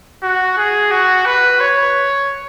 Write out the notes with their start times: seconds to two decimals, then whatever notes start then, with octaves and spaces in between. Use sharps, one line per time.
0.23 F#4
0.58 G#4
0.91 F#4
1.26 B4
1.60 C#5